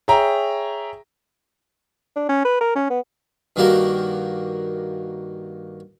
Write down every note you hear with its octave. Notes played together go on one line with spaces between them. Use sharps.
G#4 C#5 E5 G5 A#5
D4
C#4
B4
A#4
C#4
B3
G2 D#3 A#3 F#4 G4 A#4